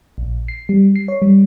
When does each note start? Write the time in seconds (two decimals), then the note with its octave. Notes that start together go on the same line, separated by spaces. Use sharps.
0.18 A#1
0.48 C7
0.69 G3
0.96 C7
1.08 C#5
1.22 G3